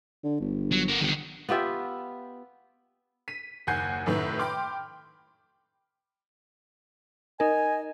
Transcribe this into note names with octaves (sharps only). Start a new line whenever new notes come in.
D3
G1
F#3
B3 A#4
G1 D3 D#3
B3 F4 G4 E5
B6 D#7
F#1 D#2 F#5 G#5 G6 C7
F1 F#2 A2 D#3 B4
G5 B5 C6 D6 F6
D#4 A#4 D#5 G#5